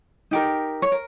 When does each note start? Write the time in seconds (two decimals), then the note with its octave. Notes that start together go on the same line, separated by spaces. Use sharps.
0.31 D#4 G4 A#4
0.82 C#5
0.92 A#4